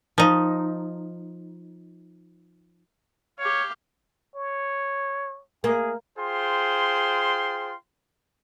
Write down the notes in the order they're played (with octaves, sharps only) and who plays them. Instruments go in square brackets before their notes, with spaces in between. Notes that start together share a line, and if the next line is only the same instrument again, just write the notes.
[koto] F3 D#4
[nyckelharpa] G4 F5 [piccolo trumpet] C#5
[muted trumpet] C#5
[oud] A#3 [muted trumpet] G#4
[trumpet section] F4 G#4 C5 G5 C6